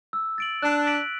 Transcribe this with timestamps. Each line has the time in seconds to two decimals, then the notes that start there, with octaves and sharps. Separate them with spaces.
0.13 E6
0.38 A6 D7 F#7
0.62 D4 F#6
0.87 B6 D7 F#7